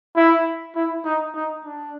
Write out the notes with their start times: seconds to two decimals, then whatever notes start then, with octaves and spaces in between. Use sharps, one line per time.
0.16 E4
0.75 E4
1.05 D#4
1.35 D#4
1.64 D4